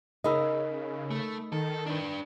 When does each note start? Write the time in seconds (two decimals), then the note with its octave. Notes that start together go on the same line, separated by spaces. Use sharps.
0.24 C#3 D#4 G#4 A#4 D#5 B5 E6
1.11 A3
1.53 D#3 A4
1.86 D4 B4